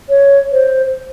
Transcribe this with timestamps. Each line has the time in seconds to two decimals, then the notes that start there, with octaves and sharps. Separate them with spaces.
0.09 C#5
0.52 C5